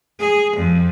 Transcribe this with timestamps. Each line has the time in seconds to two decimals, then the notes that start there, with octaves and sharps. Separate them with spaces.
0.19 G#4
0.56 F2